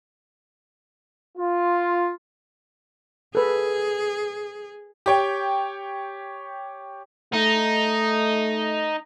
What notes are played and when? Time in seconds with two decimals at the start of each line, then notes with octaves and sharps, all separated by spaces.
1.38 F4
3.35 G#4 A4 B4
5.06 G4 C#5 G5
7.34 A3 D#4